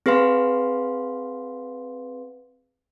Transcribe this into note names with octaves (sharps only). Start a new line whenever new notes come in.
C4 G#4 B4 F5 C6